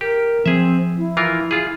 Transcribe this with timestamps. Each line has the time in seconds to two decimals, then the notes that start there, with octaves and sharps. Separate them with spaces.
0.01 G4 A#4
0.46 F3 C4 G#4 E5
0.97 E4
1.17 E3 F4 A#4
1.51 F4 G#4